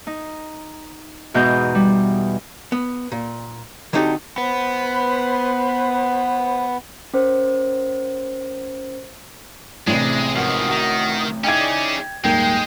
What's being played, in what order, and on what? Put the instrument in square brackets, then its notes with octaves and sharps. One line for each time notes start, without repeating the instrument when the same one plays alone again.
[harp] D#4
E2 G#2 B2 D#4 G6
G3
[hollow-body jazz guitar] B3
A#2
D3 F#3 C4 D#4 G4 A4
[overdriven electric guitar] B3 [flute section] B4 C5 B5
[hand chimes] C#4 A#4 C5
[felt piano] A1 C3 [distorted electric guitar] G#3 [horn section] C4 D4 E4
[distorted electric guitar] G#2 F3 [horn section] F#4 A#4 D#5
[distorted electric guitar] D#3
[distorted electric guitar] C#4 G#4 [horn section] D#4 E4 D5 [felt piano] G5 G#6
[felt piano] D#1 G#1 A#3 [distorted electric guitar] G#3 [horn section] G5